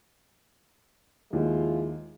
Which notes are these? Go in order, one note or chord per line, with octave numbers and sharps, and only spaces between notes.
D#2 F3 G#3 E4 F4